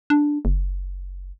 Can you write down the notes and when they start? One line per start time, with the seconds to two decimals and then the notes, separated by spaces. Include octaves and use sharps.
0.10 D4
0.45 F#1